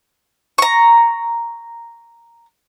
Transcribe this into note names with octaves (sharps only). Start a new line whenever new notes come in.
A#5 C#6